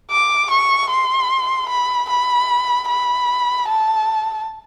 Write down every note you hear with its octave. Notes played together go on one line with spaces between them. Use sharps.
D6
C#6
C6
B5
B5
B5
A5